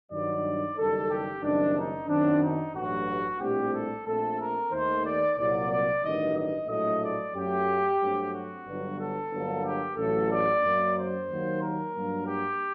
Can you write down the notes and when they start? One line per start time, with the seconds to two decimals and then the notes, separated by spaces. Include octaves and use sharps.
0.11 G2 D#3 F#3 D5
0.77 F#1 F#2 D#3 G3 A4
1.10 G4
1.43 F#1 F#2 D#3 G3 C4 D4
1.75 D#4
2.08 F#2 D#3 F#3 C4 D4
2.41 D#4
2.75 A1 G2 F#3 F#4
3.40 A#1 A2 G3 C4 G4
3.73 A4
4.05 A#1 A#2 A3 C4 A4
4.39 A#4
4.71 D#2 D#3 A3 C5
5.04 D5
5.37 C2 A#2 F#3 D5
5.69 D5
6.03 A1 G2 D#3 F#3 D#5
6.35 D#5
6.68 A#1 A2 F#3 A3 D#5
7.02 D5
7.34 F#2 F#3 A3 G4
7.99 G2 F#3 A3 C4
8.33 F#4
8.66 G1 G2 F#3
8.99 A4
9.31 G1 G2 F#3 A#3
9.64 G4
9.97 A1 A2 F#3 A4
10.30 D5
10.62 F#2 F#3 A#3
10.96 C5
11.29 D#2 D#3 F#3 A#3
11.61 A#4
11.94 G2 F#3 A#3
12.27 G4